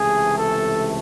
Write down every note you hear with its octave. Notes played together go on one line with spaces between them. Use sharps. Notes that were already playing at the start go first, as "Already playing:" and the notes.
Already playing: C#2 C3 E3 A3 G#4
A4